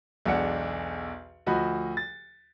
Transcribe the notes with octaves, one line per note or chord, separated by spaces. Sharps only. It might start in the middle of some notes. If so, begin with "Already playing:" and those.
B1 E2 G#3 D4 F#5 C#7
D2 F3 F#4 D#5 B5
A6